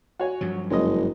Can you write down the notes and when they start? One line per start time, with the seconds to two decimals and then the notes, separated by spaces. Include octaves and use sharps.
0.19 F#4 C#5 G#5
0.41 G2 F3 F#3
0.70 F#1 G#3 D#5